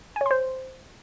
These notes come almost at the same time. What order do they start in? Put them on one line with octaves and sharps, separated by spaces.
G#5 C#5 C6 C5